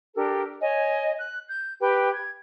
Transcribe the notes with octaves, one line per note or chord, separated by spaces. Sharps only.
D4 G4 A4 A#4
C#5 D#5 G#5
F#6
G6
G4 B4 G5
G#6